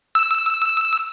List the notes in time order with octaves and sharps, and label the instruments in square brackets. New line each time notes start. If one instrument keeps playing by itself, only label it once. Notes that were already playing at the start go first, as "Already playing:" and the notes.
[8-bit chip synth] E6